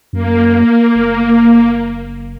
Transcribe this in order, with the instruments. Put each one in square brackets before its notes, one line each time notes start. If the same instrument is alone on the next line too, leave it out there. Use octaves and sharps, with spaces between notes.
[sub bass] F#2 [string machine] A#3
[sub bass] F#1